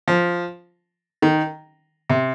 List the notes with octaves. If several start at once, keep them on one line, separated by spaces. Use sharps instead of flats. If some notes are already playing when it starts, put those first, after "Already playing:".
F3
D#3
C3